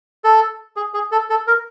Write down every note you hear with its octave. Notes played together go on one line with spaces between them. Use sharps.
A4
G#4
G#4
A4
A4
A#4